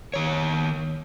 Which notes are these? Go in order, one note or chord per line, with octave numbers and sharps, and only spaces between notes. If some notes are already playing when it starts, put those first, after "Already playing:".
D#3 C#5